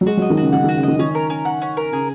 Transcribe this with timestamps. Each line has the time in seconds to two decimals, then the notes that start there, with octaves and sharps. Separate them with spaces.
0.01 F#3
0.06 G#3 F#4
0.17 F#3 D#5
0.30 D#3
0.37 C#3 F#4
0.52 D#3 F#5
0.64 D#3 F#4
0.76 C#3
0.83 D#3 D#5
0.99 D#3 C#4
1.15 A#4
1.30 C#4
1.45 F#5
1.62 C#4
1.77 A#4
1.92 C#3 G#4